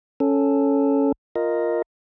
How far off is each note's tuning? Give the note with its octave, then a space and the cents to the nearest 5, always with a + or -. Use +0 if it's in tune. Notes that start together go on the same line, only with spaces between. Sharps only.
C#4 +0 A4 +0
F4 +0 A#4 +0 D#5 +0